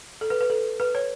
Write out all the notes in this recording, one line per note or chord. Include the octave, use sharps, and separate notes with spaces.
A4
B4
B4
A4
B4
C#5